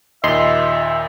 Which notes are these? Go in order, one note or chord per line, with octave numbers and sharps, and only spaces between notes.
D#2 A#2 D#5 E5 C6